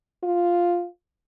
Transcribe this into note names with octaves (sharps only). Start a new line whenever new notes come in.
F4